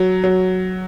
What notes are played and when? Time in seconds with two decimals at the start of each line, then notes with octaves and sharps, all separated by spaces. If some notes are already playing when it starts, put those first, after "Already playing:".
Already playing: F#3
0.24 F#3